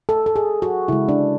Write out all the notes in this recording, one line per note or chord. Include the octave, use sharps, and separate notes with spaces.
A4
A4
G#4
F#4
C#3 G#3 E4
D4